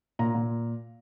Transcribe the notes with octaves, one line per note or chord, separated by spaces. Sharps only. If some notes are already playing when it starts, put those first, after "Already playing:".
A#2 A#5
A#2